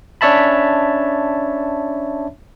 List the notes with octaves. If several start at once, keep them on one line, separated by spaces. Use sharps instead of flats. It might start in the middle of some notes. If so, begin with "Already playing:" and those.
C#4 D4 C#5 E5 A5 B5